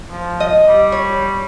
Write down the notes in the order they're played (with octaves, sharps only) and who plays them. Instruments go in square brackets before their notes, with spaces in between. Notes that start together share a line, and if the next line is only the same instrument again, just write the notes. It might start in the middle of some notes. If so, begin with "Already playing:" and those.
[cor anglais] F3
[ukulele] D#5
[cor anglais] G3
[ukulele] C#5